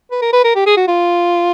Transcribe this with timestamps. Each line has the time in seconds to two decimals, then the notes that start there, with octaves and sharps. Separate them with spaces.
0.12 B4
0.22 A#4
0.33 B4
0.45 A#4
0.56 G4
0.67 G#4
0.77 F#4
0.88 F4